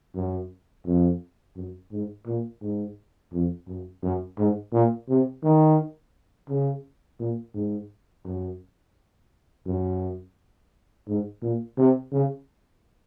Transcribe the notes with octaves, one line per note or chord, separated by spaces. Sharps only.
F#2
F2
F#2
G#2
A#2
G#2
F2
F#2
F#2
G#2
A#2
C3
D#3
C#3
A#2
G#2
F#2
F#2
G#2
A#2
C3
C#3